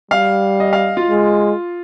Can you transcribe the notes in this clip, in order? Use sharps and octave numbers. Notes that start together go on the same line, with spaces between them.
G3 F5
D#5
F5
F4
G#3